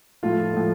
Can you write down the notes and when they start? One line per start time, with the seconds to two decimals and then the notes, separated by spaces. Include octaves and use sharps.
0.23 A2 F3 A3 F4
0.53 A2 F3 A3